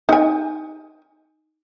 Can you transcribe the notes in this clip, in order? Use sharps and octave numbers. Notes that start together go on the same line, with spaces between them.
D#4 G#5